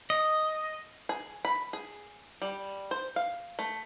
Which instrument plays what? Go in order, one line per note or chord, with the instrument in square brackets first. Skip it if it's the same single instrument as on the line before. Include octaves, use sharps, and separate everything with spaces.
[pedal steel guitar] D#5
[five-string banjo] G#4
B5
G#4
G3
C5
F5
A3